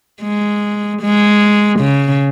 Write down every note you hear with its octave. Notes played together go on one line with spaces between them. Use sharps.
G#3
G#3
C#3